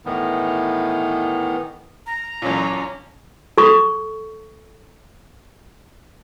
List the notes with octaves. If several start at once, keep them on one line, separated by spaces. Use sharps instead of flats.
A2 D#3 E3 B3
A#5
A1 F#2 A#2 C#4
A4 C#6